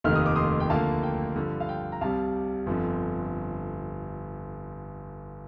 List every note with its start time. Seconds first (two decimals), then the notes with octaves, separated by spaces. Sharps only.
0.04 F1 D#2 D#3 A3 F6
0.16 D#6
0.26 D6
0.36 C6 D#6
0.60 G5
0.70 D2 D3 F3 A#3 F5 A5
1.03 G5
1.36 G2 D3 F3
1.60 F5
1.69 G5
1.92 A#5
2.01 C2 C3 G3 F5 A5
2.66 G1 F2 D3 F3